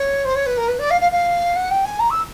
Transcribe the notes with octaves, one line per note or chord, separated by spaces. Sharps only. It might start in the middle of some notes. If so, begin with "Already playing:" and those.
Already playing: C#5
C5
C#5
B4
A#4
B4
D5
F5
F5
F5
F#5
G5
G#5
A#5
E6